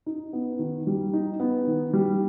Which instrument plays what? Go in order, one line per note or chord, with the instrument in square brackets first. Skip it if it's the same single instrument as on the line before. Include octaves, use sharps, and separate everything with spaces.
[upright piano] D#4
B3
D#3
G3
D#4
B3
D#3
G3